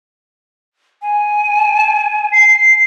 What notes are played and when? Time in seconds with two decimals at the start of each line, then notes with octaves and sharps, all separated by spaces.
1.02 G#5
2.33 C7